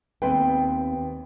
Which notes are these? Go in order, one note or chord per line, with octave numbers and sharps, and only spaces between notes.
D#2 B3 C4 B4 G5